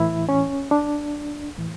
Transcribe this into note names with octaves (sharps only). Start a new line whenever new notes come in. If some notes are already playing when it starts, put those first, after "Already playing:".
Already playing: A2 E3 E4
C#4
D4
A2 E3